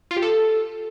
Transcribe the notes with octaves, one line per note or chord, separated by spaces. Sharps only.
F4
G4
A4